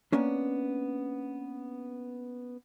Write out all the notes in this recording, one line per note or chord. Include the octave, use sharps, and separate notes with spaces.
A#3 B3 C#4 D4